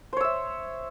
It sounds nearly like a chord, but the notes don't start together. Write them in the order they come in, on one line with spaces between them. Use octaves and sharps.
C5 C#5 E6 E5